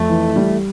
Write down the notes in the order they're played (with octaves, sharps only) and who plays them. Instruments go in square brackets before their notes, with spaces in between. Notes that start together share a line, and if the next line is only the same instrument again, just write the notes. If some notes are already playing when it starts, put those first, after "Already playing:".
Already playing: [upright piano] F2 [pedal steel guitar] A3
[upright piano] E3
G3